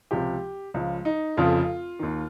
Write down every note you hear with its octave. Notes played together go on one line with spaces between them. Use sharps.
C#2 C3 F3 G4
C#2 C#3 F3
D#4
F1 F2 C#3 F3 F4
D#2 D#3